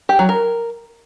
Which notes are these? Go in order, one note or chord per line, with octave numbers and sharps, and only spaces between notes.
G4
F#3
A#4